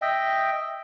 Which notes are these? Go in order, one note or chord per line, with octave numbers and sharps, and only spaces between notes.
D#5 E5 G5